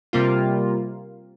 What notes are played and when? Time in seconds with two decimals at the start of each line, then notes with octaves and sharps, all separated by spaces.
0.13 C3 G3 A#3 F4